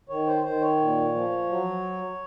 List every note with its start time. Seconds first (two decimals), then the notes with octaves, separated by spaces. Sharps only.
0.09 D#3 C#5
0.27 C5
0.44 D#3 C5
0.61 C#5
0.79 A#2
1.15 F3
1.49 F#3